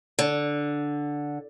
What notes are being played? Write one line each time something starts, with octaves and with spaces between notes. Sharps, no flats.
D3